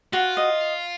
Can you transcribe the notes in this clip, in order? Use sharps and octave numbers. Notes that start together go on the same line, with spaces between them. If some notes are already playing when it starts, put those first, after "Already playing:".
F4 F#4
D#5